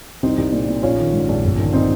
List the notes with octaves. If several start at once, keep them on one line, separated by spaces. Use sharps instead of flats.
C2 C4 D#4
C2
A#2
A#2
A#1 C#4 F4
D#3
G#2
A#1
G1
D#3
C4 D#4